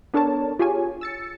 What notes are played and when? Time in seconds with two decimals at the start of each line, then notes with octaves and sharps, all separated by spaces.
0.14 B3 D4 A4 A#4 C#5 A5
0.59 F4 G4 G#4 C#5 G#5
1.01 E6 A6 C#7